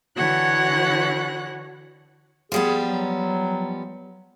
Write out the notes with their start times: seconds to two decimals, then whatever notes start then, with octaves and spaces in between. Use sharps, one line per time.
0.16 D3 E3 F#4 C#5 F#5 F#6
2.52 F3 G3 B3 G#4
2.84 F#3